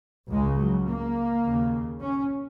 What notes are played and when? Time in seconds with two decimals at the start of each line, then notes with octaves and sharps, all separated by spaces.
0.31 C#2 C#3 G#3
0.59 F#3
0.87 A#3
1.45 D#2 C#3
2.01 C#4